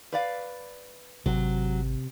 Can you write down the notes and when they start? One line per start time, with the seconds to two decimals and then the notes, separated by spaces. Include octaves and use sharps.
0.12 B4 D5 F5
1.26 G#1 C3 F#3